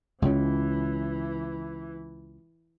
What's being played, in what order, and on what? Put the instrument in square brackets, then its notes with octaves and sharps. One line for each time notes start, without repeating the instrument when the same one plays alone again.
[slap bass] C#2 C#3 [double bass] E3